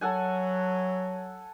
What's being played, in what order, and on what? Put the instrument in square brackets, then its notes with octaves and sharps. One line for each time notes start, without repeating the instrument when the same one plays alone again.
[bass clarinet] F#3 [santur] A4 F#5 G#5